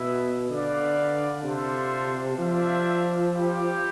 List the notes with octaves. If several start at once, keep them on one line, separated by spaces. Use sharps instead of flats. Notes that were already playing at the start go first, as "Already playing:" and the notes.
Already playing: B2 B3 E4 B4 E5
D3 E4 B4 D5 F5
C3 D4 F4 A4 C5 E5
F3 D4 F4 C5 E5
G3 C4 G4